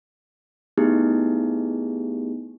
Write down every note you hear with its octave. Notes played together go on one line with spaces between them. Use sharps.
A3 B3 D#4 E4 G4 G#4